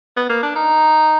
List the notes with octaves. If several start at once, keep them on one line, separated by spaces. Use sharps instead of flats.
B3
A#3
D4
D#4